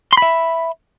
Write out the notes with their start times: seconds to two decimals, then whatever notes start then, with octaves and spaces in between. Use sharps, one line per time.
0.13 C6
0.17 B5
0.22 E5